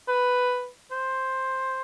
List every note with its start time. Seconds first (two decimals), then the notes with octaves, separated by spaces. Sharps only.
0.08 B4
0.92 C5